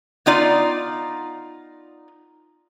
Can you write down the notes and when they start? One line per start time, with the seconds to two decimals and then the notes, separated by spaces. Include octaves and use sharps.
0.26 B3 D#4 F4 D5